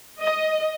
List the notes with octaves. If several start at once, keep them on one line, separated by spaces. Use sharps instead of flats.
D#5